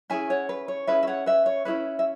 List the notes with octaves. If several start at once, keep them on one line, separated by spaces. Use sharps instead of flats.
C#4 E4 G#4 E5 G#5
C#5 F#5
B4
C#5
C#4 E4 G#4 B4 E5
E5
C#5 F#5
B4 E5
C#5
C#4 E4 G#4 B4 E5
E5